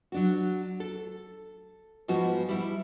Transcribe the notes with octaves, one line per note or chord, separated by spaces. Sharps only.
F#3 D4 F#4
A4
G#2 F3 G3 B3 F#4
G3 E4